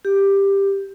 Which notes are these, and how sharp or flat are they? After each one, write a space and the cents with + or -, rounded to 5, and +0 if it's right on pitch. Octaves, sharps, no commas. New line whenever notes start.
G4 +10